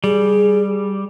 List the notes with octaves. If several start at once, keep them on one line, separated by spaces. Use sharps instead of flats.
G3 G#4